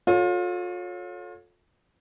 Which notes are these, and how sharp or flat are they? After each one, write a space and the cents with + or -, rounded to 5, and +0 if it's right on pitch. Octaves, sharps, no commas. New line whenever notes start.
F4 +35 A4 +0 C#5 +0